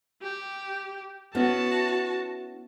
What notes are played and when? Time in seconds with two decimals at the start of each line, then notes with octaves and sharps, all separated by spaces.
0.22 G4
1.35 B3 C#4 E4 F#4 A5